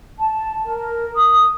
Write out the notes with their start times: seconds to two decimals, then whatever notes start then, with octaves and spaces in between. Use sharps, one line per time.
0.20 A5
0.64 A#4
1.16 D#6